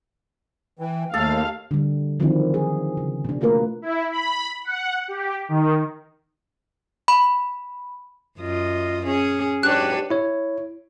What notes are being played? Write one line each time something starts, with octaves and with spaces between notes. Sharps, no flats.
E3 G5
D#2 A3 A4 F5
D3 G3
D#3 F3 F#3 C4 D4 E4
G#4
C#3
B2 D4
A3 A#3 F4 A#4 B4
E4
B5
F#5
G4
D#3
B5
F#2 F4 D#5
C#4 G#4
G#2 F#3 D4 G4 B4 C#5 F#6
E4 C#5